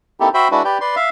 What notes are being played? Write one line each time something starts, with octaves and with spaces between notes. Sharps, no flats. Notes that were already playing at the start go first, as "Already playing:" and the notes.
A#3 C4 D#4 E4 G4 A4
F#4 C5 E5 G5 B5
G#3 D4 E4 F#4 B4
G4 B4 D5 G5
B4 D5 C6
E5 F5